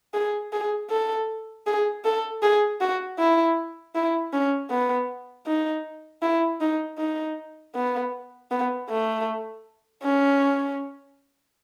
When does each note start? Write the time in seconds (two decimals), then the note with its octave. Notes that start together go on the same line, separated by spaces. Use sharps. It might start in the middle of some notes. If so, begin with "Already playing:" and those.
0.14 G#4
0.53 G#4
0.90 A4
1.66 G#4
2.05 A4
2.42 G#4
2.81 F#4
3.19 E4
3.95 E4
4.33 C#4
4.70 B3
5.47 D#4
6.22 E4
6.61 D#4
6.98 D#4
7.75 B3
8.51 B3
8.90 A3
10.03 C#4